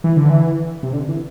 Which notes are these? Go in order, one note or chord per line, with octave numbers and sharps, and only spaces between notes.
E3
D3
E3
C3
D3
E3